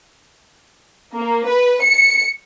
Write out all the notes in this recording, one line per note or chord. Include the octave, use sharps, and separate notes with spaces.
A#3
B4
C#7